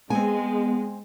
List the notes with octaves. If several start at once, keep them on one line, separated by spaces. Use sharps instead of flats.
G#3 B3 C4 G#5